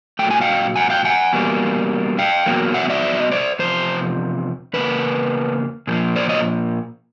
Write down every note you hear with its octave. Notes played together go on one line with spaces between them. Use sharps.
A#2 F#3 A3 G5
G#5
F5 G5
F#5 G#5
F5 G5
F#5 G#5
E2 B2 G3 A#3
F5 G5
E2 B2 F#3 A#3
E5 F#5
D5 E5
D#5
C5 D5
E2 C3 F3 C5
E2 C#3 A#3 B4
A#2 F3 A#3
C5 D5
C#5 D#5